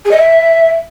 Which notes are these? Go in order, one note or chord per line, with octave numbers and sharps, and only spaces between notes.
G#4
D#5
E5